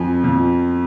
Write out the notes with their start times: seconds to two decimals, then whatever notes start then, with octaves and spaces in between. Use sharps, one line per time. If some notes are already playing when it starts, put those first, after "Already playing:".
Already playing: F2 F3 G#5
0.24 F2 F3